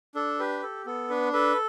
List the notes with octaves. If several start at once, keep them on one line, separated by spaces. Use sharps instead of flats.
D4 A4
G4 B4
A4
B3 A4
D4 B4
A4 B4